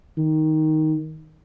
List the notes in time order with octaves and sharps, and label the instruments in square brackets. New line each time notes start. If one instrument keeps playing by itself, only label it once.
[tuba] D#3